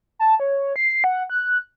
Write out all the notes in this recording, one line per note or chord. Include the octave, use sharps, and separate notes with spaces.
A5
C#5
C7
F#5
F#6